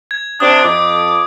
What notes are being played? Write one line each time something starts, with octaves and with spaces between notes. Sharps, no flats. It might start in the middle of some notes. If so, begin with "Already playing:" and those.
G#6
C3 D4 D#6
F2 D6